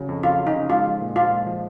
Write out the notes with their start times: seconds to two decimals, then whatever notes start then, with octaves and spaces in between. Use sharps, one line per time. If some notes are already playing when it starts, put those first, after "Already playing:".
Already playing: C#3 F#3
0.09 F2
0.23 F2 F4
0.38 F#3
0.47 D#4
0.54 C#3
0.70 G#3 F4
0.86 F3
1.01 A#2
1.16 A#2 F4
1.31 G#3
1.46 F3